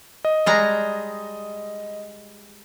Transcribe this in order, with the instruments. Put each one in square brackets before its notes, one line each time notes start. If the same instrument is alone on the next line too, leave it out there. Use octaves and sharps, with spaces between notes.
[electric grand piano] D#5
[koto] G3 G#3 A#5